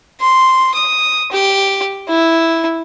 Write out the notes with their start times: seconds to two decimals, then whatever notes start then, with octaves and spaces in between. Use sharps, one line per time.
0.21 C6
0.75 D#6
1.32 G4
2.09 E4